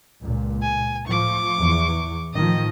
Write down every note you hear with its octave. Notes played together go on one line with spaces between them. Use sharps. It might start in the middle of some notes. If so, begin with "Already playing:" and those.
C#2 A#2
G#5
A2 F3 C#6 D6
E2 E3
A2 D#3 F3 D#5